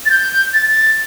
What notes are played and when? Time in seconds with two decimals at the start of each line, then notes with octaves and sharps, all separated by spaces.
0.05 A6
0.10 G6
0.53 A6
0.70 A6